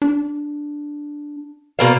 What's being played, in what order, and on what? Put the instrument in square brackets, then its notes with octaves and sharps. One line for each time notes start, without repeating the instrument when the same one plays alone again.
[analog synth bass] D4
[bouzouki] B2 A#3 F5